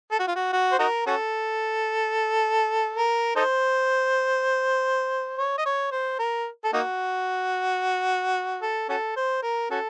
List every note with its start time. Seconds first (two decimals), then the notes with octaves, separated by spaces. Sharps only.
0.11 A4
0.20 F#4
0.28 F4
0.36 F#4
0.53 F#4
0.72 C5
0.79 D#4 F#4 A#4
1.06 C#4 F#4 A4
2.96 A#4
3.36 D#4 A4 C5
5.38 C#5
5.58 D#5
5.65 C#5
5.92 C5
6.19 A#4
6.64 A4
6.73 A#3 D#4 F#4
8.62 A4
8.89 C#4 F#4 A4
9.16 C5
9.43 A#4
9.71 C#4 F#4 A4